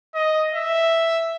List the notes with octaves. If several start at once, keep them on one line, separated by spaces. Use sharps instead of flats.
D#5
E5